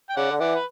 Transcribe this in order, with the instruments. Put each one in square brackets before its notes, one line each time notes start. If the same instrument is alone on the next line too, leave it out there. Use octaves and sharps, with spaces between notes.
[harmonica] G5
[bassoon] C#3 [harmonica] D5 F#5
[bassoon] D3
[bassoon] E3 [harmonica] D5 F#5
[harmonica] B4